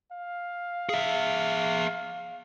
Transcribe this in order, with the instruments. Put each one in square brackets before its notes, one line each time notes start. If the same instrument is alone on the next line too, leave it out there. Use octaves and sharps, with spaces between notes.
[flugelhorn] F5
[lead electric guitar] G#4 E5